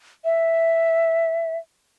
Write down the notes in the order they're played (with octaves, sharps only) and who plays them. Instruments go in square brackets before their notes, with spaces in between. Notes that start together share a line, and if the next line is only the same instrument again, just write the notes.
[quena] E5